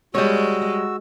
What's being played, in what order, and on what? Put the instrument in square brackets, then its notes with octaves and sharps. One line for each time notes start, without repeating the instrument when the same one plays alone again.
[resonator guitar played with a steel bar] G3 C#5 [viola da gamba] G#3 [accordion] F#4 E6